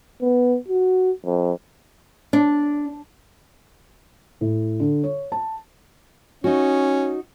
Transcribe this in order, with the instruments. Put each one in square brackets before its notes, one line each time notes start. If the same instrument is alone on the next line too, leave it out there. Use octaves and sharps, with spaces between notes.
[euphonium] B3
F#4
F2
[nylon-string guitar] D4
[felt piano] A2
D3
C#5
A5
[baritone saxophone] C#4 [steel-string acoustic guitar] D#4 F#4